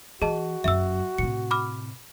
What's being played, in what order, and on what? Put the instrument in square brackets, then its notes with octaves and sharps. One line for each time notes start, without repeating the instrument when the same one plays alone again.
[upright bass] E3 [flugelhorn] F#4 [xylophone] G#4 D#5 A5
[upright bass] F#1 F#2 [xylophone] E5 E6
[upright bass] A2 C3 [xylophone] C#7
[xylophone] B5 D6 F6